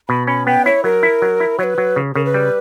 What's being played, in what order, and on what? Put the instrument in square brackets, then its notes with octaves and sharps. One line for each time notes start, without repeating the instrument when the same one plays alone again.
[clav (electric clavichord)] B2 [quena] B5
[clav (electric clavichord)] C#4 [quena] B5
[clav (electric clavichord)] B3 [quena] G5
[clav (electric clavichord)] E4 [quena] C#5
[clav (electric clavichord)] F#3 [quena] A#4
[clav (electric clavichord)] E4
F#3
E4
[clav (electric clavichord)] F#3 [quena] C#5
[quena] B4
[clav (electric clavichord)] F#3
C#3
[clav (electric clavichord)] C#3 [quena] A#4
[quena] B4
[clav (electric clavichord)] G3